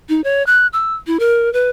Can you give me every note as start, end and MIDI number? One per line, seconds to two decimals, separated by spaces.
0.09 0.23 63
0.24 0.45 73
0.47 0.67 90
0.73 0.95 88
1.07 1.17 64
1.20 1.52 70
1.53 1.70 71